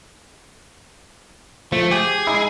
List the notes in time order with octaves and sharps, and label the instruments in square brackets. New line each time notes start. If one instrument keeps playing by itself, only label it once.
[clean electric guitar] F3 [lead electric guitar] A3
[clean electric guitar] G4 [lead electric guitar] G#4
[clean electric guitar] G#3 D#4 E4